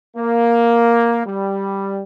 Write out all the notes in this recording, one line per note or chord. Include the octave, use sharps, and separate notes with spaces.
A#3
G3